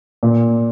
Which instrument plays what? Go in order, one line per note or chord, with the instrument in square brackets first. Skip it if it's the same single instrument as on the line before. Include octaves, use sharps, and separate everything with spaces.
[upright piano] A#2